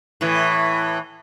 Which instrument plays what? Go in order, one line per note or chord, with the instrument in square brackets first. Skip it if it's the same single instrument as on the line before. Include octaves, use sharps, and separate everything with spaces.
[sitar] A2 E3